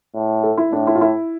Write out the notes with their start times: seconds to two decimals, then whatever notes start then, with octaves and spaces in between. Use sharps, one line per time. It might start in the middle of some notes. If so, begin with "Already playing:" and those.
0.15 A2
0.43 A4
0.58 E4
0.72 A2 D4
0.87 E4
0.95 F4
1.01 E4